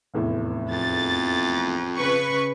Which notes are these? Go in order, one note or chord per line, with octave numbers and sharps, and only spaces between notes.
F1 E2 A2
F2 A6
C#3 B4 C#6